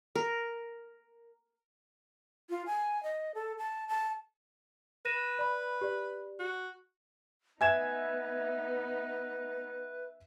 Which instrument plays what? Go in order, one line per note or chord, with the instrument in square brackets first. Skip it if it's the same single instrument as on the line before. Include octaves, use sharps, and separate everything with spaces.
[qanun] A#4
[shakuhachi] F4
G#5
D#5
A4
A5
A5
[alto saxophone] B4 [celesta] A#6 D#7 E7
[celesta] D5 B5
G4 D5
[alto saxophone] F#4
[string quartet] B3 D#4 [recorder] B4 [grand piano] E5 G#6 E7 [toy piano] G#5